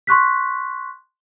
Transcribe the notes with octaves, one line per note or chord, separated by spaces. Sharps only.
C6 C#6 F#6 B6